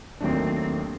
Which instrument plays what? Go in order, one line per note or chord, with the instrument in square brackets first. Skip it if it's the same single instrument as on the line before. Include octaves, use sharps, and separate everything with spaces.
[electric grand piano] D#2 D#3 F#3 A3 D4 [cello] C4